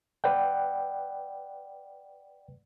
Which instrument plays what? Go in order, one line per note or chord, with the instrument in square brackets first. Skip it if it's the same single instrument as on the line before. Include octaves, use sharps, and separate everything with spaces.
[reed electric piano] B4 D5 F#5 G5